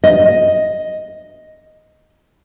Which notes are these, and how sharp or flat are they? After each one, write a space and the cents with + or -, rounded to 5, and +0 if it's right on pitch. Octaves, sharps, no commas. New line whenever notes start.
D#5 +5